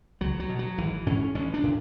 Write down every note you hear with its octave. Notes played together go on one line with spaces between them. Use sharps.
C#2 F#3
F#3
B2
F#3
G#1 E3
G#2 C#4
A1 C#4
D4
A2